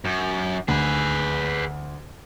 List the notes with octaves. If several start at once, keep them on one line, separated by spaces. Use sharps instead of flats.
F#2
D2 G#4 B4